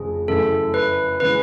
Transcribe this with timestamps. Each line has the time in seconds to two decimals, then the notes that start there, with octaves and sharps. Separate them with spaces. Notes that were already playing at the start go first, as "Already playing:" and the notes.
Already playing: F1 F2 C#3 G#4
0.28 F#2 C#3 E3 A3 A4
0.74 B4
1.20 C#3 E3 G#3 B4